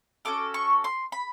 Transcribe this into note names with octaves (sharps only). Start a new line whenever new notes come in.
C#4 F#4 A4 D6
C#6
C6
B5